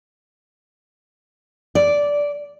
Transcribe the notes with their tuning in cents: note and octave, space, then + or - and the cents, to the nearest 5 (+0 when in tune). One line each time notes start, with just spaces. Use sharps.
D5 -10